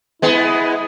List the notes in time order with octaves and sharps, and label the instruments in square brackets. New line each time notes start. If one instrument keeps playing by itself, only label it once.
[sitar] G#3 B3 [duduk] E4